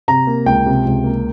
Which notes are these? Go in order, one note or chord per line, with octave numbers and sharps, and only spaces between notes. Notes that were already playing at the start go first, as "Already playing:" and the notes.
C3 A#5
A#3
C#2 G5
C3
C#2
A#3